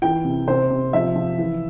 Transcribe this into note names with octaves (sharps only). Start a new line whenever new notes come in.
E3 G5
C3
C3 C5
C3
F3 E5
F3
E3